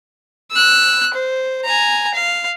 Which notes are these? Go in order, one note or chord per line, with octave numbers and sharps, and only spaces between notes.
E6 F#6
C5
G#5 A#5
F5